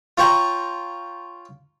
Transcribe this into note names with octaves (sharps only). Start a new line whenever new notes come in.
F4 C#5 G5 A#5